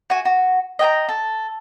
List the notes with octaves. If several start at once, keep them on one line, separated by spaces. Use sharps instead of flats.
F#4 G#5
F#4
D#5 G5 G#5 A#5
A4